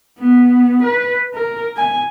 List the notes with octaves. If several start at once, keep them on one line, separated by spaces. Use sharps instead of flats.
B3
B4
A#4
G#5